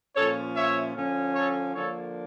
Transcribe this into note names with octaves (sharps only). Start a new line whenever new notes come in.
A#2 F3 C#4 A4 C#5
C#5 E5
D3 F3 C#4
A4 C#5
D3 F3 A#3 D4 A4 C#5